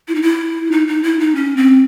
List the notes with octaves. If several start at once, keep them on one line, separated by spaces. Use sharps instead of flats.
E4
D#4
E4
D#4
D#4
E4
D#4
C#4
C4